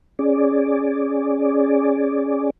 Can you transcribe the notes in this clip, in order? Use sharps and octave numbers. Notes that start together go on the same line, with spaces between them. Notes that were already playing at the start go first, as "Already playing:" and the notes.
C#4 G#4 D5